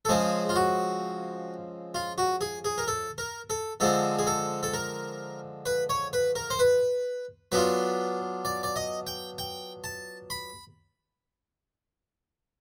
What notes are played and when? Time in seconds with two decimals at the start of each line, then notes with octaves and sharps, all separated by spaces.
0.05 A4
0.09 C#3 F3 G#3 C4 G#4
0.49 F4
0.56 F#4
1.95 F4
2.18 F#4
2.41 G#4
2.65 G#4
2.78 A#4
2.88 A4
3.18 A#4
3.50 A4
3.80 D3 F3 G#3 C4 A4
4.19 G#4
4.27 A4
4.63 A4
4.74 A#4
5.66 B4
5.89 C#5
6.13 B4
6.35 A#4
6.50 C5
6.59 B4
7.52 F#3 B3 D4 F4 B4
8.45 D5
8.63 D5
8.76 D#5
9.07 G5
9.38 G5
9.84 A5
10.30 B5